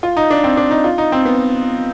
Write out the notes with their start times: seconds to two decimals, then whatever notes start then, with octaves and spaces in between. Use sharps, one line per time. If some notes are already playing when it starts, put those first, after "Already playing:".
0.03 F4
0.17 D#4
0.30 D4
0.44 C4
0.57 D4
0.71 D#4
0.84 F4
0.98 D#4
1.12 C4
1.25 B3